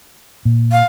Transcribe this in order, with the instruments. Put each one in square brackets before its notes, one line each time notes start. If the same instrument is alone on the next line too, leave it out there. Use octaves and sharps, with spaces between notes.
[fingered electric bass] A#2
[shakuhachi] F5